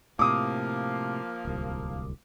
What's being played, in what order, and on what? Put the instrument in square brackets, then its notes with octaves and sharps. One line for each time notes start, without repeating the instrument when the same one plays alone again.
[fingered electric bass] A2 C3 [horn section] F3 A#3 [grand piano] D6 D#6
[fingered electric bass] D1 C2